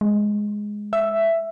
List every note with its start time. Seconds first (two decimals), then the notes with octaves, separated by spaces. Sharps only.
0.01 G#3
0.93 E5